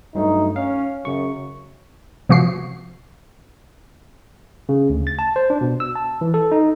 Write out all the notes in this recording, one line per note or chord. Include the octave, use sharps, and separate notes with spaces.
G2 F#3 A3 D#4
C#4 F5
F#2 C#3 C#6
C3 F3 F#4 C7
C#3
D2
A6
A5
C5
D4
B2
E6
A5
E3
A4
D#4